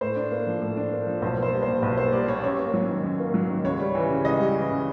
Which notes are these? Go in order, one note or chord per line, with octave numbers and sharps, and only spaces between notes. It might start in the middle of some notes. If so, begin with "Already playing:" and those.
A2 C5
D4
A#3
F3
A2
D4
A#3
F3
B1 C5
A#3 C5
G3
C5
A#2
B1 B4
A#3 C5
G3 D5
A#2 C#5
F#2 C#5
A#3
F#3
D#3
F#2
A#3
F#3
D#3
C#2 C#5
G3
E3
C#3
C#2 D#5
G3
E3
C#3